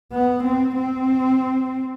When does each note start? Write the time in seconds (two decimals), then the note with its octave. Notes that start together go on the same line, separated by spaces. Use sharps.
0.13 B3
0.44 C4
0.77 C4